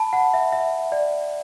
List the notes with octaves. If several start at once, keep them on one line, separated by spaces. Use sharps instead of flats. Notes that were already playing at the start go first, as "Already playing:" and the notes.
Already playing: A5 B5
F#5
E5
E5
D5